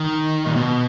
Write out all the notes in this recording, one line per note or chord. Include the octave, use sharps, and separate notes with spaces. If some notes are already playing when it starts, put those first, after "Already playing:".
Already playing: D#3
A#2
B2